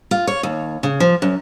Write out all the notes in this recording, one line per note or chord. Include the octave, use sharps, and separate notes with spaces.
F4
C#5
D#2
C#3
F3
F#2